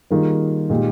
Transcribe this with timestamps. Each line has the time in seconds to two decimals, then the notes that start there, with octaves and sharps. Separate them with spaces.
0.10 D#3 G3 A#3 F4 G#4
0.70 A#2 G#3 D#4 G4